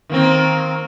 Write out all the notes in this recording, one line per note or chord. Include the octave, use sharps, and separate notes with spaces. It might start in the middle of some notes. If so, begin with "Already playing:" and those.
D#3 A#3 C4